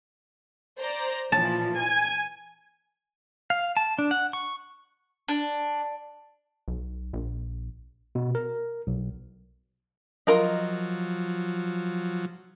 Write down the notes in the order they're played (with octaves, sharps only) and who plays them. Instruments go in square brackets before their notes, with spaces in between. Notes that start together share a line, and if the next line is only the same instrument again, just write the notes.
[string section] C5 D5 A#5
[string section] A#2 E3 F3 [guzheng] A5
[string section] G#5
[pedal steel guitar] F5
A5
D4
F#5
C#6
[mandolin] D4
[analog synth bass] B1
A#1
[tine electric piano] B2
A#4
B1
[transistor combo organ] F3 F#3 [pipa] F4 A#4 D#5